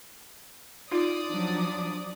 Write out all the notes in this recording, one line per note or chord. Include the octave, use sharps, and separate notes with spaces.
D#4 F4 D5 D#6
F3 F#3 D4